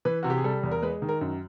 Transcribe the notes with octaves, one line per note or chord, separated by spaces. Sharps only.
E3 B4
C3 F#4
G4
G#4
G3 A4
E2
A#4
G#3 B4
D#3
A#4
F#2